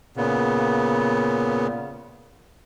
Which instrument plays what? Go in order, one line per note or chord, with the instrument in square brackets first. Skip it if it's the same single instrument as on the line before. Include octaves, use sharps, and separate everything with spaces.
[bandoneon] A#2 C#3 B3